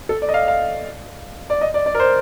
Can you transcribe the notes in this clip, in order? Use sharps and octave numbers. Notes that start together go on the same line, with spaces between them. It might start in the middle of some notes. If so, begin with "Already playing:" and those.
A4
D5
D#5
F5
F5
D5
D#5
D5
D5
A#4
C5